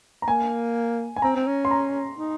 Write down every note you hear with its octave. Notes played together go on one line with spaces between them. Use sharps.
A#5
A#3 G#5
G#5
C4 A#5
C4
C#4
C6
A#5
D#4